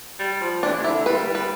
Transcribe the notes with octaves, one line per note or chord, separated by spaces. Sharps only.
G3
F3
E3 D4
C3
D3 E4
G3 B4
B4